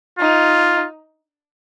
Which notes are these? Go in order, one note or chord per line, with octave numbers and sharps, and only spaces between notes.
D#4 F4